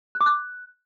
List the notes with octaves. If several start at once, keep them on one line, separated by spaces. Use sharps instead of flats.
F#6
D6
F#6